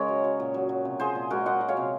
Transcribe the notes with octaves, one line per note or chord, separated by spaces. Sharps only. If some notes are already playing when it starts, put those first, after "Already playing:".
Already playing: C#3 G#3 A#4 C#5 D#5
F#3
F#3
A#2
F#3
F#3
C3
F3 G#4 C5
A#2
G#3 F#4 A#4
F#3 D#5 F#5
F#3
C#5 F5
C3